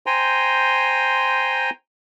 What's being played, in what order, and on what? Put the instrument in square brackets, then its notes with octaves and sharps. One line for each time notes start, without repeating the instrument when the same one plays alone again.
[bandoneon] C5 G5 G#5 A#5 C6